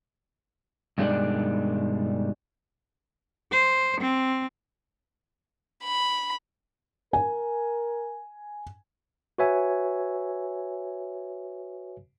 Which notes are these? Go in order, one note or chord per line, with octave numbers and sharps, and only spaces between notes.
G2 B2 D#3 G#3 D4 D5
C5
C4
B5
A#4 G#5
F#4 B4 C#5 E5 G#5